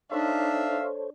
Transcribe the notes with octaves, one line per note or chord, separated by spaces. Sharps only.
D4 D#4 A4 C5 C#5 E5 F5